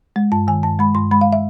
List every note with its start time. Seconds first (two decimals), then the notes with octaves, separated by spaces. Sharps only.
0.16 G#3
0.32 G2 A5
0.47 D#3 G#5
0.63 G2 A5
0.79 G#3 B5
0.95 G2 C6
1.11 G#3 B5
1.21 F5
1.33 E5